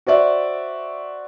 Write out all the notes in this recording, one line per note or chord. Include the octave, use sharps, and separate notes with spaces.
F#4 C5 D5 E5